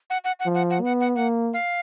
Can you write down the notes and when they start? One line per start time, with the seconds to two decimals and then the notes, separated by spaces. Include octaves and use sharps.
0.10 F#5
0.24 F#5
0.40 F#5
0.46 F3
0.55 F#5
0.70 F#5
0.82 B3 F#5
1.00 F#5
1.16 A#3 F#5
1.53 F5